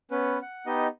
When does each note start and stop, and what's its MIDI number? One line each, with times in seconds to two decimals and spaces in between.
0.11 0.38 59
0.11 0.38 61
0.11 0.38 71
0.42 0.66 78
0.66 0.87 59
0.66 0.87 63
0.66 0.87 67
0.66 0.87 75